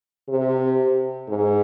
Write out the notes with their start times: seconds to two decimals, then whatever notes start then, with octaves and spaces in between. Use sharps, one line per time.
0.29 C3
1.29 G#2